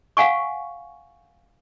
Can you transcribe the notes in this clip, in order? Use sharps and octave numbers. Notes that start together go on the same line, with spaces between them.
F5 F#5 G#5 C#6